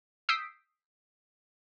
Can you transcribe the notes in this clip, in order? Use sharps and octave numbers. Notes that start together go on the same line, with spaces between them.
D#6 E6 G6 B6 C7 D7